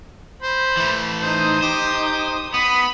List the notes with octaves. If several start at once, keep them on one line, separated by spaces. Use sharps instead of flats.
C5 B5
E3 A3
D#4 C5 D#6
G4 C5
B3 B5 D#6